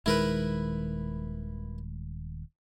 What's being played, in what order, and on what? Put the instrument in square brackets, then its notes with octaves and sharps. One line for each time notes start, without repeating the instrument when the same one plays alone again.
[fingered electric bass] D#1 D#3 G#3 [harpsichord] E4 A#4 B4